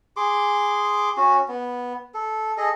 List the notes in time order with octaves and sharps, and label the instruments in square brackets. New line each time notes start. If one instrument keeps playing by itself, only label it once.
[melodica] G#4 C6 D6
C#4 F#4
B3
A4
G#4 A4 D#5